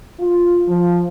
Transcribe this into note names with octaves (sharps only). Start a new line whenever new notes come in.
F4
F3